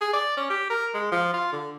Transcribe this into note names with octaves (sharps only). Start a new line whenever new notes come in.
G#4
D5
C#4
G4
A#4
G#3
F3
F4
D3